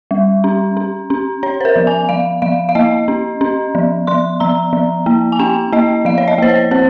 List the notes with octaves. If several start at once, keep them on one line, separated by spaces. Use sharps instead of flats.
G3
C#4
C#4
C#4
C#4 C#5
C5
A#4
F3
G#5
F3 F5
F3 F5
F5
A#3 D#5
C#4
C#4
F3
F3 C6
F3 A#5
F3
A#3
G#5
C#4 G5
A#3 D#5
F3 F5
C#5
D#5
A#3 C5
C#5
C4 C5